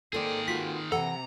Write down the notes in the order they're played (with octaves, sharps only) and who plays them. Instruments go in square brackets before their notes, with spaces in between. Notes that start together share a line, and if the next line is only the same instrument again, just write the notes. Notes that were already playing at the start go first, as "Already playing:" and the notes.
[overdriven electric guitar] D#3 G#4 [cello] A#3 G5 [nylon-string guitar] A4 C5 D5
[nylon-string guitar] F4 F#4 B4 [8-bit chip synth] B6
[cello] C3 [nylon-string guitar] E3 F#5 [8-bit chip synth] A4 [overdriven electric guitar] A#5